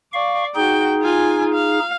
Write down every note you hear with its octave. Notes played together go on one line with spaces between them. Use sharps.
D5 F5 C#6
D#4 F#4 G#4 G5
F4 G#5
F5